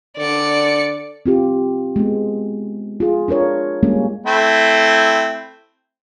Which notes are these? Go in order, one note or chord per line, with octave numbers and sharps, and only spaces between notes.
D3 D5 C#7
C4 F4 G4
G#3 B3
F4 G#4
D4 F4 A#4 C#5
G3 G#3 A#3 C#4
A3 C4 E4